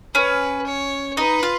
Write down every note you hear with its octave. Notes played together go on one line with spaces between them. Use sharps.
C#4 B4
C#5
D#4 B4
F4